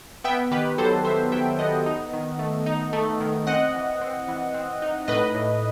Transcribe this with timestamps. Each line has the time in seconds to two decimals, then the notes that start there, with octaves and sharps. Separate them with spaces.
0.24 B3 E5 G5
0.51 D#3 G4 B4
0.78 F#3 A4 C5
1.05 F#3 C5 E5
1.32 F#3 E5 G5
1.59 B3 D#5 F#5
1.86 D#4
2.13 D#3
2.39 A3
2.66 D#4
2.93 A3
3.20 D#3
3.47 C4 D#5 F#5
3.75 E3
4.01 C4
4.28 E3
4.54 C4
4.82 D#4
5.08 A2 B4 D#5
5.35 A2